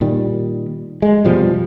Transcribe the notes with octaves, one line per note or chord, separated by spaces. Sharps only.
A#2 D#3 G3
G#3
F1 B2 F3 G3